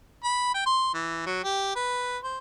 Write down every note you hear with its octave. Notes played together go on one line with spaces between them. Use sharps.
B5
G5
C6
E3
F#3
G4
B4
C5